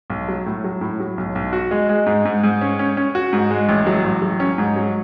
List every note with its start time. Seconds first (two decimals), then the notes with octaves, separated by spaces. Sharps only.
0.10 B1
0.28 F#3
0.46 A2
0.64 F#3
0.81 A2
1.00 F#3
1.18 B1
1.35 B1
1.53 F#4
1.71 G#3
1.89 G#3
2.06 G#2
2.25 G#2
2.43 G#2
2.61 C#4
2.79 C#4
2.97 C#4
3.15 F#4
3.33 G#2
3.51 G#3
3.69 A1
3.87 F#3
4.04 A1
4.22 F#3
4.40 C#4
4.58 G#2
4.76 F#3